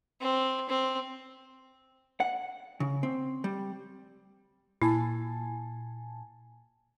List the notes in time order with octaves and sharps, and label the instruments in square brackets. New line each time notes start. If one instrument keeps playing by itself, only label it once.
[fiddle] C4
C4
[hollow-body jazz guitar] F#5
C#3
C4
G3
[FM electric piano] A#2 G#5 A5 [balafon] E4